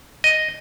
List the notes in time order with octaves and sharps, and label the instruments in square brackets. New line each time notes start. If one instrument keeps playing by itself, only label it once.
[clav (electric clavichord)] D#5